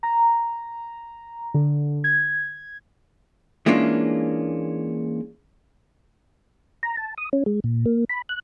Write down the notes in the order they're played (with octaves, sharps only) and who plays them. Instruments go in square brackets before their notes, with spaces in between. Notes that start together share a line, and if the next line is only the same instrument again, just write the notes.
[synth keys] A#5
D3
G#6
[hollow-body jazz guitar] E3 G#3 A#3 C#4 D4 F4
[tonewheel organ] A#5
A5
D#6
C#4
G#3
A#2
A#3
B5
F#6